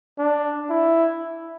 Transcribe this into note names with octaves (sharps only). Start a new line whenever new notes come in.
D4
E4